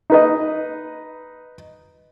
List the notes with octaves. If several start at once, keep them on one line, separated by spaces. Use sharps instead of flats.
D#4 B4 D#5